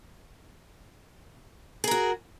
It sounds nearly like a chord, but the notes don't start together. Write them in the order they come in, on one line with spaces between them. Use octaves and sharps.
G#4 A#4 F#4